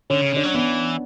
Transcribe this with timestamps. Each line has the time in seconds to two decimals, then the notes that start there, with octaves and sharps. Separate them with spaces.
0.10 D3 C#4
0.21 C#3
0.32 D3 D4
0.44 F#3 C#4
0.54 E3 B3